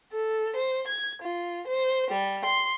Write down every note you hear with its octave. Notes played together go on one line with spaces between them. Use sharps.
A4
C5
G#6
F4
C5
G3
C6